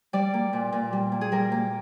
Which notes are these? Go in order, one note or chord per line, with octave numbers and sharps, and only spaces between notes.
G3 D5
A#3
A#2
A#2
G3
A#3
G#4
G3 A#4
A#3